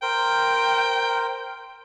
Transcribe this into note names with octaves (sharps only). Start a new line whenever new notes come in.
A#4 C5 G5